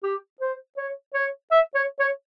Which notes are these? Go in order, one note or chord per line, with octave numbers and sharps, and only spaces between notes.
G4
C5
C#5
C#5
E5
C#5
C#5